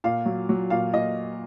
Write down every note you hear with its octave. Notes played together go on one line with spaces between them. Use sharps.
A#2 F5
F#3
F#3
A#2 F5
A#2 D#5